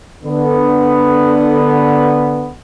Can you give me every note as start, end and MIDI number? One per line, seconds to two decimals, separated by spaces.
0.23 2.51 50
0.23 2.51 59